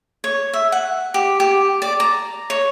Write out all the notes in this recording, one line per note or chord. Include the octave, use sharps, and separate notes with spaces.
C#5
E5
F#5
G4
G4
D5
A#5
C#5